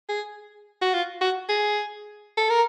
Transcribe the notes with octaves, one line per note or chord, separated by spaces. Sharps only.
G#4
F#4
F4
F#4
G#4
A4
A#4